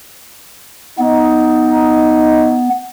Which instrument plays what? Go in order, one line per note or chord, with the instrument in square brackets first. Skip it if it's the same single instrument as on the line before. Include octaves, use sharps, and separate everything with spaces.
[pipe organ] B3 [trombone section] D#4